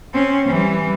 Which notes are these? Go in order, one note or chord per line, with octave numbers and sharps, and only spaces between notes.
C4 C#4
E3 G3